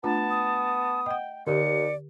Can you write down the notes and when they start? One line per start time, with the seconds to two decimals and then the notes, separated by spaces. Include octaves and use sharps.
0.04 A3 B3 D4 F4 A5
0.30 D#6
1.06 D#5 F#5 G5
1.47 D#2 D3 G4 D5 C#7